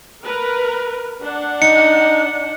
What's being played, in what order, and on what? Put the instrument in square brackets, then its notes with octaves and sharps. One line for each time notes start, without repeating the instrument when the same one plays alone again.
[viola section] A#4 B4
D4 F#5
[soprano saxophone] D#4 [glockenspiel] C#7